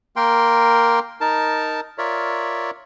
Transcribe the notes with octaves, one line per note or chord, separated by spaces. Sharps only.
A#3 A#4 G5 C6
D#4 A#4 A5
F4 A#4 C#5 D5 E5